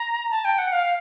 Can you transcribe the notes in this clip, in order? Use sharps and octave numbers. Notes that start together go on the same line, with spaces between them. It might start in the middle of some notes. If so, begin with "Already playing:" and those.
Already playing: A#5
A5
G5
F#5
F5